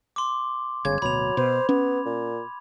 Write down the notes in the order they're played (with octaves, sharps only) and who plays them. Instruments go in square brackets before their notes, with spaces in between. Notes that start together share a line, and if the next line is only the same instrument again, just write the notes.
[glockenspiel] C6 D6
[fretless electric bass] G1 [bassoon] C#3 [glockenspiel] G#6
[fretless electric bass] D1 B2 [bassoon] F#3 [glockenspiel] B5 F7
[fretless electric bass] B2 [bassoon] C5
[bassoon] B3 [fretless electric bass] C#4
[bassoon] A#2